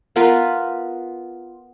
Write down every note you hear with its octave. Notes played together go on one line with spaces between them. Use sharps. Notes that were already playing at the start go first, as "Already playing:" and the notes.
B3 F4 A#4 B4